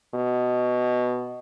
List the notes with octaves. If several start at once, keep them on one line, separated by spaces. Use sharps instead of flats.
B2